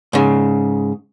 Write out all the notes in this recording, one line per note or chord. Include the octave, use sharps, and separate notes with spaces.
G#2 C#3